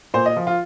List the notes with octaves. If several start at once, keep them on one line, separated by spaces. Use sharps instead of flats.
A#2 C5
D#5
F3
F4